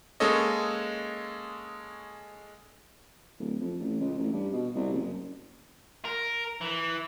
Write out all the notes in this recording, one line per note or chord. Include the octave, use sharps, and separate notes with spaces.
G#3 A#3 C#4 A4 C#5 D#5
D1
F2
A1
C#2
A1
G2
B2
C2
F#1
A#4
E3